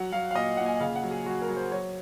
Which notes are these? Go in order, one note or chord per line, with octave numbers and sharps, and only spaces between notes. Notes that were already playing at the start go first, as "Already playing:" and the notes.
Already playing: F#3 F#5
F#3 F5
F5
A#2 D#5
A#2 F#5
G#5
C#3 F5
F#5
F#3
G#4
F#3 F#4
A#4
F#3
C5
F#3 C#5